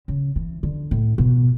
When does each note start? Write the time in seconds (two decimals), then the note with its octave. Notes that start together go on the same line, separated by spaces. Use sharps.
0.08 C#3
0.36 E3
0.63 D3
0.91 A2
1.18 B2